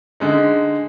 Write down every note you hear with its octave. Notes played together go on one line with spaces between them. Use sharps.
D3 G#3 D#4